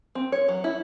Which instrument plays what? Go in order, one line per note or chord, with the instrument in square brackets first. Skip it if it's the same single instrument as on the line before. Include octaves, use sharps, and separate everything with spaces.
[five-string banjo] C4
C#5
F#3
E4